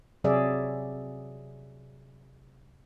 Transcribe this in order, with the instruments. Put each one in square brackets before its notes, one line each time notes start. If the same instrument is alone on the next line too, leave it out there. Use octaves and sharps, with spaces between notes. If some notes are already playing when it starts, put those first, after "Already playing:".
[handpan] C3 F#3 G#4 D5 E5